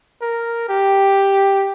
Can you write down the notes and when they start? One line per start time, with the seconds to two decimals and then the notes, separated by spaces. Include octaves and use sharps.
0.21 A#4
0.69 G4